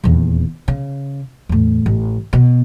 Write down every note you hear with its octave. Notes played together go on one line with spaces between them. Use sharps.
D#1 E2
C#3
E2 A2
A1
B2